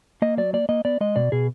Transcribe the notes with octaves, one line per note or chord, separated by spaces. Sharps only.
A#3 D#5
F#3 D5
A#3 D5
A#3 D#5
B3 D5
G#3 D#5
B2 D5
B2 G#4